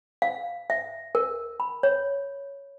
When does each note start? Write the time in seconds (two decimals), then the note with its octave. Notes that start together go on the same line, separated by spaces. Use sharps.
0.22 F5
0.70 E5
1.15 A#4
1.60 B5
1.83 C#5